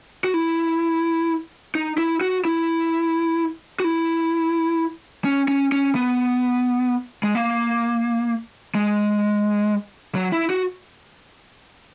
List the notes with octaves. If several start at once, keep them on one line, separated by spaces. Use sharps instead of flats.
F#4
E4
D#4
E4
F#4
E4
F#4
E4
C#4
C#4
C#4
B3
G#3
A#3
G#3
F#3
E4
F#4